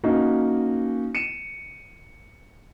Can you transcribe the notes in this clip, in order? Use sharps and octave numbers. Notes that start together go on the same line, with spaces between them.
A#3 C#4 D#4 F#4
C#7 D#7 E7